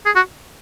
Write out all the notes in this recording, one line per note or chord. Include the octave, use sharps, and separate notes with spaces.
G#4
F#4